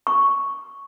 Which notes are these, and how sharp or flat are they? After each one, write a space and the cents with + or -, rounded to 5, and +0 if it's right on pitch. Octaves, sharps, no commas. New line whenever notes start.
C#6 +0